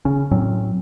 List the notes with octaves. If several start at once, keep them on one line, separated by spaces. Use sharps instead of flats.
C#3 C#4
A2 F#3 C4 C#4